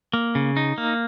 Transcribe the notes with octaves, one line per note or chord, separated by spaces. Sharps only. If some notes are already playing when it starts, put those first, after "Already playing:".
A#3
C#3
D#4
A#3